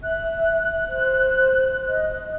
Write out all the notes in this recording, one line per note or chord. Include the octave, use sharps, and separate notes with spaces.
E5 F#6
C5
D#5